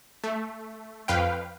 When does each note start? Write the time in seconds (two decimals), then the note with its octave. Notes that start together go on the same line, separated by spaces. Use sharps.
0.24 A3
1.08 F2 B4 F5 G5